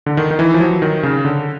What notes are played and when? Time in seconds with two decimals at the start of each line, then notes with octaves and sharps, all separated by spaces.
0.06 D3
0.17 D#3
0.31 D#3
0.39 E3
0.54 F3
0.60 F#3
0.82 D#3
1.03 C#3
1.25 D3